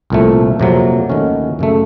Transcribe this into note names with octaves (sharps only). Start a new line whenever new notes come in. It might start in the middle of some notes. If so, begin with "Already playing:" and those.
C2 A#2 F3 A3
F2 C3 F#3 A#3
D#2 D#3 A3 C#4 F#4
F#2 C#3 A3